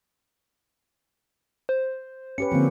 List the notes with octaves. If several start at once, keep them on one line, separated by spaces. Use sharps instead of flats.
C5
C#4 G4 B4 C#7
D3 F3 A#3 C4